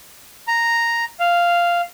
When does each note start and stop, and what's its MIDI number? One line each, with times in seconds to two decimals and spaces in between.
0.48 1.04 82
1.20 1.81 77